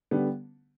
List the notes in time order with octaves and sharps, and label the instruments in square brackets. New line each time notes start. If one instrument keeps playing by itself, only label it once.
[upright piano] D3 G3 B3